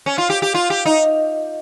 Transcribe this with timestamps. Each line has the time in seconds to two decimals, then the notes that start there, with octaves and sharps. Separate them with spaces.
0.06 C#4
0.18 F4
0.30 G4
0.42 G4
0.55 F4
0.70 G4
0.86 D#4